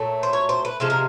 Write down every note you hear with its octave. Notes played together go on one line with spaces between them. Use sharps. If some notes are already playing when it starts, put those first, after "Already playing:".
Already playing: A#2 F#3 A3
C5
C#5
C5
B4
C3 F3 G#3 A4
A#4